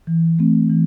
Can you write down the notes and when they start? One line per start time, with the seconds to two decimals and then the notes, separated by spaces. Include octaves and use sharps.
0.07 E3
0.39 A3 C4
0.70 E3